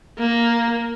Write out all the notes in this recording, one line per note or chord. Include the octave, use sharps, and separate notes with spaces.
A#3